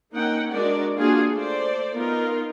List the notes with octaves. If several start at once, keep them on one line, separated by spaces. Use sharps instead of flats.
A#3 C#4 D#4 F#5 G5
G#3 D4 F#4 A#4 D5
A#3 D4 F4 F#4 G#4
A3 C5 D5
B3 D#4 F4 A#4